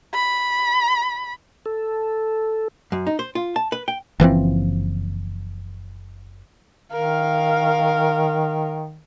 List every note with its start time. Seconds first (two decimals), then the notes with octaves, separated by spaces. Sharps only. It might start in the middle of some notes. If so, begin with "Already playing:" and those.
0.14 B5
1.66 A4
2.92 F#2
3.07 D#4
3.19 C5
3.35 F4
3.56 A5
3.72 B4
3.88 G5
4.20 F#1 E3 F3 C4
6.93 D#3 A#4 F5